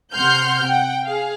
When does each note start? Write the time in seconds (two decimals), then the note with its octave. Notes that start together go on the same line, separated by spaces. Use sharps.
0.14 C3 F#5 C6 F6 G6
0.66 F#5 G5
1.05 G#4 F5